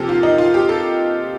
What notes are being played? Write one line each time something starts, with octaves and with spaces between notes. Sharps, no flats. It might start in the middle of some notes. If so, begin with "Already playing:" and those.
Already playing: C3 F3 A#3 G4 A4
F4
D#4
F4
G4
A4